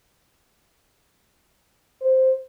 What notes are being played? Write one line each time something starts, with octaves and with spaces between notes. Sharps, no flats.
C5